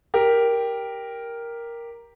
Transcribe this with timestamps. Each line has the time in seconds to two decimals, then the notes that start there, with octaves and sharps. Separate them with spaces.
0.14 G4 A#4